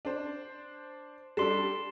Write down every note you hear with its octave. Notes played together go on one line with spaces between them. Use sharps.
D4 C5
G3 D4 A4 C6 C7 E7